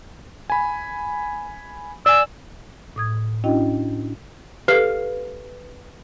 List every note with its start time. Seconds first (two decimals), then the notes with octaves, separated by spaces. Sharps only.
0.50 G#5 B5
2.06 D5 G#5 E6
2.96 A2 D#6 G#6
3.44 C#4 D4 E4 F#4 D#5 G5
4.68 G4 A4 B4 F5